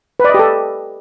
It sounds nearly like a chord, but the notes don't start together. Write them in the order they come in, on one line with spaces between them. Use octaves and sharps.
B4 D5 D#5 G4 A4